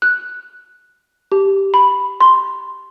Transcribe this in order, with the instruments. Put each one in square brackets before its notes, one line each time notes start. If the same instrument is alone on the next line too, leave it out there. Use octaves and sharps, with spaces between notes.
[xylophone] F#6
G4
B5
C6